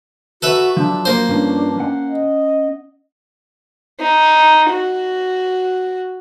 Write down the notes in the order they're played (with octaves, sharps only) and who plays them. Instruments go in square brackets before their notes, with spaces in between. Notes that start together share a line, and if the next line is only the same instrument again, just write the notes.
[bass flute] F#4 [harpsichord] A4 B4 E5
[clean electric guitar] F3 F#3 [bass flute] D4
[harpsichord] A#3 C5
[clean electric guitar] G2 F3 C#4 [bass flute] D4
[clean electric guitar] C#4 F#5
[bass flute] D#5
[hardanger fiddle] D#4
F#4